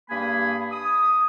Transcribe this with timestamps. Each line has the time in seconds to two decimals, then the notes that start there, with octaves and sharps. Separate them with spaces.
0.10 G2 A#3 G#4 G#5 B5
0.71 D#6